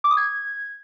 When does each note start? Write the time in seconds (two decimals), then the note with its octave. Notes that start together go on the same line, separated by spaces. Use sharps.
0.04 D6
0.11 D#6
0.17 G#6